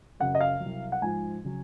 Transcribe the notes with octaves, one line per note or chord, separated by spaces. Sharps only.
F#2 C#3 F#3 F#5
D#5
F5
C2 C3 F#3
F#5
G#2 F3 G#5
C#3 F#3